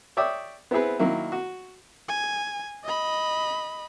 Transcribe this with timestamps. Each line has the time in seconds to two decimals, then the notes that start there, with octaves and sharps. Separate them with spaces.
0.17 C#5 D5 E5 G5 D#6
0.71 B3 C4 E4 G#4 B4
0.99 D#3 F#3 A#3 E4
1.32 F#4
2.09 G#5
2.84 D#5 B5